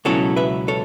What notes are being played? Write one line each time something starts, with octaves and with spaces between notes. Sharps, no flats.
C#2 B2 F#3 C#4 E4 A4 C#5
B4 E5
A4 C#5